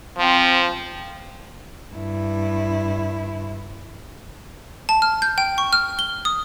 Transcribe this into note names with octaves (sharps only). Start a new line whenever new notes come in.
F3 C4
G2 E4
A5
F6
G6
G5
C#6
F6
G7
D#6